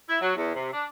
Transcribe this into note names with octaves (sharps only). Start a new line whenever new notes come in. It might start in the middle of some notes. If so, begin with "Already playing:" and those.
E4
F#3
E2
C3
D4